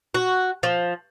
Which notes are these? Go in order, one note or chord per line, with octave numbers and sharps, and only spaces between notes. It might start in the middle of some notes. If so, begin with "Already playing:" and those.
F#4
F3